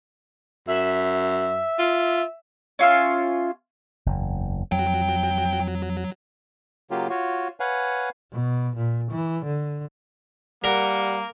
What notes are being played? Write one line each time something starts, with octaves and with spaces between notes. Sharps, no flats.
F#2 E5
F4
C#4 F4 E5 F5
F#1 E2
F2 F#3 G5
C#3 F#3 A#3 F4 G4
F4 F#4 C#5
B4 C#5 F5 F#5 G#5
B2
A#2
E3
D3
G3 A#3 A#4 F#5